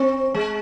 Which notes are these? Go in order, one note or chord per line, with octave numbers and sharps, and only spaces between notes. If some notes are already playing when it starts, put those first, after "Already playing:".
Already playing: C4
G#3